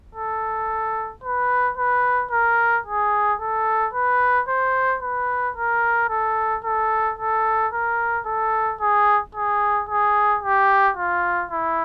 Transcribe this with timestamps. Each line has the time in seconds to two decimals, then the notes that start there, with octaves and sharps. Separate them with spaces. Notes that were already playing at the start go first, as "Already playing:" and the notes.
0.15 A4
1.24 B4
1.78 B4
2.31 A#4
2.86 G#4
3.40 A4
3.93 B4
4.49 C5
5.03 B4
5.56 A#4
6.10 A4
6.65 A4
7.19 A4
7.73 A#4
8.26 A4
8.81 G#4
9.35 G#4
9.89 G#4
10.43 G4
10.97 F4
11.51 E4